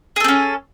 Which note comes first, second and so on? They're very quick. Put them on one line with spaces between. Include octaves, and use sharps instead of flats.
G#4 A4 C4 C#4